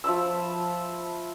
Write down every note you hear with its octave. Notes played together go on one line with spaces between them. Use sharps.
F3 E5 B5 E6